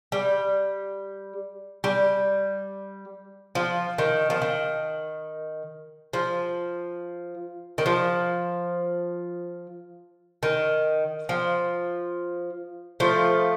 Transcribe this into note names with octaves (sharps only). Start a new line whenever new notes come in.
G3
G3
F3
D#3
F3
D#3
F3
D#3
F3
D#3
F3
F3 A3